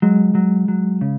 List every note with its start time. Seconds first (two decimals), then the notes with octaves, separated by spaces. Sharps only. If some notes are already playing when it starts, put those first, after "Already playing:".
0.02 F#3 G#3
0.35 F#3
0.68 F#3
1.01 C#3